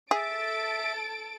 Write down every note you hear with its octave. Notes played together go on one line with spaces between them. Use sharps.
G#4 A4 E5 A6 D7